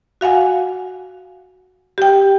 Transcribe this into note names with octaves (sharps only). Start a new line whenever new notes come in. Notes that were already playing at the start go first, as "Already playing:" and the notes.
F#4 F5 F#5 G#5
G4 G5